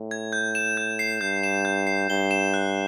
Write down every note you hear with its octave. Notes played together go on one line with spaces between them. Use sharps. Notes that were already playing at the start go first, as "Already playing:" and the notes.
Already playing: A2
G#6
G6
E7
G6
C7
G2 G6
E7
G6
C7
G2 G7
E7
F#6